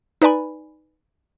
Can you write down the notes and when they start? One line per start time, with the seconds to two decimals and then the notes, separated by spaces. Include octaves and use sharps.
0.22 D#4 B4 D5 G#5 B5